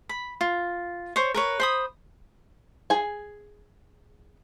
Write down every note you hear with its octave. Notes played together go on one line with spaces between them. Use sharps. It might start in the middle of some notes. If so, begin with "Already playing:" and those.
B5
F4
C5 C#5
A#4 B4 C#5
C5 B5 D#6
G#4 G#5